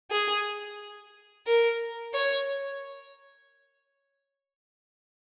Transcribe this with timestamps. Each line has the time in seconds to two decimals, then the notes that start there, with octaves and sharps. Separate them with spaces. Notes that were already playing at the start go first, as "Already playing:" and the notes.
0.11 G#4
1.46 A#4
2.14 C#5